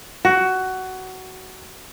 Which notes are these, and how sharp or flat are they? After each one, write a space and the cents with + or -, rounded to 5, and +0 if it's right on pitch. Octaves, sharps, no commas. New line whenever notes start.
F#4 +15